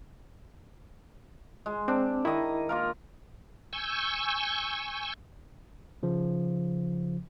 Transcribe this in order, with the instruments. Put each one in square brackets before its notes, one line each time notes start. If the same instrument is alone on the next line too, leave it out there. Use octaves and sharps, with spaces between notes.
[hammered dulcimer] G#3
[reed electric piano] C4 [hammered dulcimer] D4
[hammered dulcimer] D#3 D#5 [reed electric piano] E4
[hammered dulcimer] A#3 F4 A#4
[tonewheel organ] G#5 C#6 E6 G6
[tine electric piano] C#3 F3